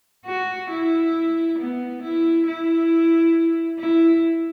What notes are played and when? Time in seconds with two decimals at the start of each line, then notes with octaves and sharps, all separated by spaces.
0.26 F#4
0.71 E4
1.59 B3
2.03 E4
2.47 E4
3.80 E4